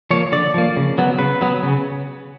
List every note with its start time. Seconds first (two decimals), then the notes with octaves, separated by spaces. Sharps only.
0.11 F3 A#3 C#5
0.32 D3 D5
0.54 F3 A#3
0.77 C#3
0.98 F#3 B3
1.19 C#3 B4
1.41 F#3 B3
1.63 C#3